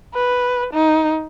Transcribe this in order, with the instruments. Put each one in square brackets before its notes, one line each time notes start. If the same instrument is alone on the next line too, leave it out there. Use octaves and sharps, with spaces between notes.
[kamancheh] B4
D#4